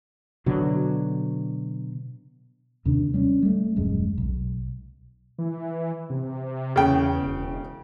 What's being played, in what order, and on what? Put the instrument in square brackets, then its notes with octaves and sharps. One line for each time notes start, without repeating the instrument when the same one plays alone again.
[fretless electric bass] B2 D3 F#3
[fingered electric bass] D#2 C3 D#3 D4
G3 C#4
G3 A3
D#1 F#2 G#3
B1
[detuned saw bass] E3
C3
[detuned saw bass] E2 [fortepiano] C#3 G5
[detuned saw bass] E1